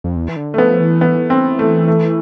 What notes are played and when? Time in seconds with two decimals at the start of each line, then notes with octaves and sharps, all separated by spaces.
0.04 F2
0.16 E2
0.29 E3
0.36 D3
0.54 A3
0.58 F3 B3
0.80 E3
1.01 B3
1.30 C4
1.59 A3
1.88 A3